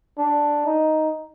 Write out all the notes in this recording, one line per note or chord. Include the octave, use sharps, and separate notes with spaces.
D4
D#4